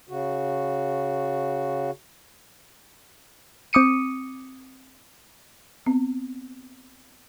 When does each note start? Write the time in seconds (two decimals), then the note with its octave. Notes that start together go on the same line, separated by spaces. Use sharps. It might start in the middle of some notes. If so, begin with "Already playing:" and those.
0.09 C#3 F#4
3.73 C4 D6 D#6 C#7 D#7
5.86 B3 C4